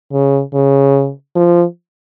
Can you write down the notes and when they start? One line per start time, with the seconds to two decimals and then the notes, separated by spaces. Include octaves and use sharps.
0.12 C#3
0.54 C#3
1.35 F3